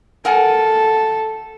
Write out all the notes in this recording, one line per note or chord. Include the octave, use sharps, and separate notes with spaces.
A4 A#4 F#5 G#5